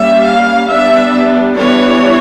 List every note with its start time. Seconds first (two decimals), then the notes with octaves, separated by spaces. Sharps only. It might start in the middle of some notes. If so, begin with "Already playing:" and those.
Already playing: G3 A#3 C#4 E5
0.26 F5
0.70 G3 B3 D4 E5
1.56 E3 G3 B3 D4 C#5